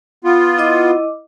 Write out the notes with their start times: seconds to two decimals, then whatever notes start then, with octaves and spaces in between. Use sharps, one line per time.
0.24 B3 F4
0.58 E4 D#5 D6